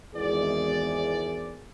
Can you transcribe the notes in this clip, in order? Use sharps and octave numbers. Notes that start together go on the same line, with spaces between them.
G#1 E2 G#4 D5